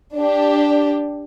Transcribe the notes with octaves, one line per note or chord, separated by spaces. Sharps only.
D4 G4